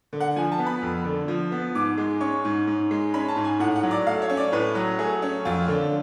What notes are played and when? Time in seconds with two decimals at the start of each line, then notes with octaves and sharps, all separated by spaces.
0.13 D3
0.20 F#5
0.36 F3 G#5
0.52 A5
0.59 B3
0.67 B5
0.82 F2
1.05 D3
1.28 F3
1.52 B3
1.75 G#2 D6
1.98 G#3
2.20 C#4 C#6
2.45 G#2
2.67 G#2
2.91 G#3
3.14 C#4 B5
3.28 A5
3.37 G#2
3.44 G#5
3.60 A2 F#5
3.76 F#5
3.83 F#3
3.91 D5
4.07 A3 F5
4.22 C#5
4.30 C#4
4.37 D5
4.52 A2 B4
4.75 F#3
4.98 A3 G#4
5.22 C#4
5.45 F2 F4
5.68 D3